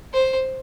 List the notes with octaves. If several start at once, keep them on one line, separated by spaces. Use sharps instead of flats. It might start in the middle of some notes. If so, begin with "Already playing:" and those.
C5